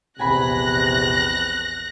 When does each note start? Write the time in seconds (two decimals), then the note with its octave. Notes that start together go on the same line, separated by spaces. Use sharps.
0.19 A#1 E2 C3 G#5 B5 F#6 A#6